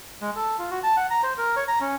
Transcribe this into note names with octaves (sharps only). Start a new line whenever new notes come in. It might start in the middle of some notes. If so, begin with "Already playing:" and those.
G#3
A4
F4
F#4
A5
F#5
A#5
C5
A#4
C#5
A#5
C#4